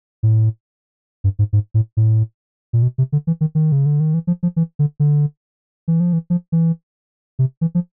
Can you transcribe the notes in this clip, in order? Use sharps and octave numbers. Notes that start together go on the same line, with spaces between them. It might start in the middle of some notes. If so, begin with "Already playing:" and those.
A2
G2
G#2
G#2
A2
A2
A#2
B2
C3
D3
E3
D#3
D#3
C#3
D3
D#3
E3
F3
F3
E3
D3
D3
E3
F3
E3
F3
E3
C3
E3
F3